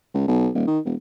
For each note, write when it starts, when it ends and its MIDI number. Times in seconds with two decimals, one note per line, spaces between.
0.14 0.28 37
0.28 0.49 35
0.54 0.65 27
0.67 0.79 51
0.85 0.94 28